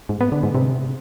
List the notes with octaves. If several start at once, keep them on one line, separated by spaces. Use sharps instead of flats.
G#2
B3
D3
G#2
C3